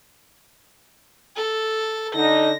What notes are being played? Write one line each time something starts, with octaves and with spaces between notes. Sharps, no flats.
A4
D3 D#4 A#6